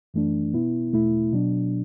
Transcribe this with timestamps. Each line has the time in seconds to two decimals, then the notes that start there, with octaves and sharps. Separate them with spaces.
0.14 F#2 E3 A3 D4
0.54 B2 B3 E4
0.93 E2 B2 A3 E4
1.33 B2 F#3 D4